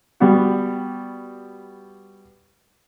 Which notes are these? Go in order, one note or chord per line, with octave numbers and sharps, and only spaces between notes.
G3 B3 F#4